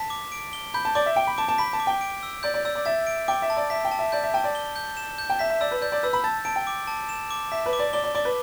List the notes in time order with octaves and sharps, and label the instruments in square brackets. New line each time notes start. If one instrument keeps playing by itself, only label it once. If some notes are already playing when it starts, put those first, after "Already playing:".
Already playing: [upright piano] A5 [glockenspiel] B6
[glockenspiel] D6
D7
G7
[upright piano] B5 [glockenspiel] G6
[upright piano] A5
[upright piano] D5 [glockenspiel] D6
[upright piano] E5
[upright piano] G5 [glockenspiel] D7
[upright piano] B5
[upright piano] A5 [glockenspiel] D6
[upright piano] A5
[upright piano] B5 [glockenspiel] B6
[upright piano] A5
[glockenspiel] D6
[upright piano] G5
[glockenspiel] D7
E6
[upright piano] D5 [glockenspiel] G6
[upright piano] D5
[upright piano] D5 [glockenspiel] E6
[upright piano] D5
[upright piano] E5 [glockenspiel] A6
[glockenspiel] D7
[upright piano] G5 [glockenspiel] D6
[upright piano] E5
[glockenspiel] A5
[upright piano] D5
[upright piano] E5 [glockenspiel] B6
[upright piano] G5
[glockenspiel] A5
[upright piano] E5
[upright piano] D5 [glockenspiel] G6
[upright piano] E5
[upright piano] G5 [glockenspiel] A5
[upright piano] D5
[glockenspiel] G7
G6
E7
G6
[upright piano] G5
[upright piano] E5 [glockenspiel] B6
[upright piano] E5
[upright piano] D5 [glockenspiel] E6
[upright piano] B4
[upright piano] D5 [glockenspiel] G6
[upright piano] D5
[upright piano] B4 [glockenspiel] E6
[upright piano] B5
[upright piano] A5 [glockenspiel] A6
[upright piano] A5 [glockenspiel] D7
[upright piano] G5
[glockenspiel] D6
A5
E7
D6
[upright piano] E5 [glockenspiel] B6
[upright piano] B4
[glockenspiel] D6
[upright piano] D5
[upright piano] D5 [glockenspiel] G7
[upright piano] D5
[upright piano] D5 [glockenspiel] D6
[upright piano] B4